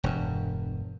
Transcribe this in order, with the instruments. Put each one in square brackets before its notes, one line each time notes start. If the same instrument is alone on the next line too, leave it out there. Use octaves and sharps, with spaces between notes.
[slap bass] E1 G2